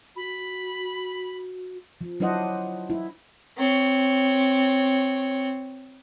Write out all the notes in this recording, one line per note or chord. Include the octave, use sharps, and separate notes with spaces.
F#4 B5
F3
F#3 D4 E4 C5 D#5 F#5
E4
C4 C#5